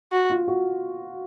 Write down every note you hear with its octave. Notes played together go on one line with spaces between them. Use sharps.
F#4
F4
F#4